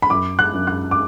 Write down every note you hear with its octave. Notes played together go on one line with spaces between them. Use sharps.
B5
F#2 D6
F#6
F#2
F#6
D6